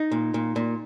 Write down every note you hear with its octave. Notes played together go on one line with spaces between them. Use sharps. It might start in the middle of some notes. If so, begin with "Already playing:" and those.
Already playing: D#4
A#2
A#2
A#2